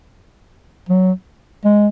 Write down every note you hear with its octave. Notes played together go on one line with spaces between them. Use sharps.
F#3
G#3